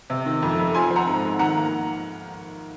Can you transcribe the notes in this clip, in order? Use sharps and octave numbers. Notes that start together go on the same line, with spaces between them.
C3
D#3
F2
F2
F3 G#5 C6
C4
F#5 A#5
G#2
G#2
D#3 F#5 A#5
A#3